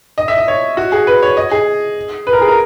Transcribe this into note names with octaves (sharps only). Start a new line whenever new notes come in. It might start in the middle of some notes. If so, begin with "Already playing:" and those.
D#5
E5
D#5
C#5
F#4
G#4
B4
C#5
D#5
G#4
B4
A#4
G#4
A#4